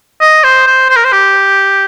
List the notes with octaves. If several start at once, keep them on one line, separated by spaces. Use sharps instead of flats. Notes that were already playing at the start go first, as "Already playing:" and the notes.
D#5
C5
C5
C5
A#4
C5
G4